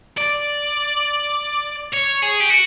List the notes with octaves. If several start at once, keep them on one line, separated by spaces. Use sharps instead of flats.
D5
C#5
G#4
G4
F#4